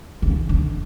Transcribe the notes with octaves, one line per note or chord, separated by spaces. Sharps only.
C#3
D3